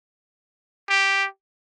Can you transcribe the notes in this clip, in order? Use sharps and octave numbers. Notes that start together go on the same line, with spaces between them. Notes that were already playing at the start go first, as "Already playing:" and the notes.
G4